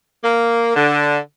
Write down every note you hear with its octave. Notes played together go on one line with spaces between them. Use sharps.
A#3
D3